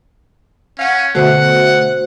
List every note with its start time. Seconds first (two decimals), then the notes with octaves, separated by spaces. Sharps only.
0.79 C#4 F5 F#5
1.15 B2 D3 A3 F#4 C5 F#5